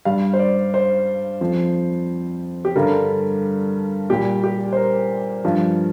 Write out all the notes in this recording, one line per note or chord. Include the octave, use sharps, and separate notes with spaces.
G2 G3 F5
C5
D5
C5
F2 F3
G4
G2 D3 G3 A#4
A#2 G3 G4
G4
C5
A#4
G2 F3